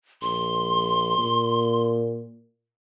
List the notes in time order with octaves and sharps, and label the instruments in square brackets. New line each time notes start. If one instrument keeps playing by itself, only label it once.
[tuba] A#1 [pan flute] C6
[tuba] A#2